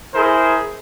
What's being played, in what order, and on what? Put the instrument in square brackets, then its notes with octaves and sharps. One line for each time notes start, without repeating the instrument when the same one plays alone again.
[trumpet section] E4 G#4 A#4 C5